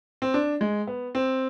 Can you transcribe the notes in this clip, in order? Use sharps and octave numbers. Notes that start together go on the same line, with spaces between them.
C4
D4
G#3
B3
C4